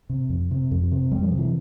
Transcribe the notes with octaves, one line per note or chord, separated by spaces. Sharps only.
C3
F2
C3
F2
C3
F2 G3
F3
C3
E3